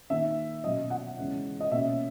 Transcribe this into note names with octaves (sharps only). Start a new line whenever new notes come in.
D#3 A#3 D#4 E5
B2 F#3 C#4 D#5
F#5
E2 C#3 G#3 C#4
D#5
B2 A#3 C#4 E5